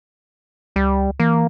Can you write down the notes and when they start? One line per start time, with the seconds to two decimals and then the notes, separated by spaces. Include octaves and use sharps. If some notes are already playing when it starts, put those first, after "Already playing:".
0.76 C#2 G3
1.20 E3 A#3